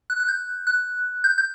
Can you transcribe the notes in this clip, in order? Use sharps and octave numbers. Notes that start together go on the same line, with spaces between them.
F#6
F#6
G6
F#6
G6
G6